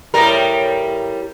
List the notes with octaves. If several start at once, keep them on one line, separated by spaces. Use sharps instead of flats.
A2 G3 A#4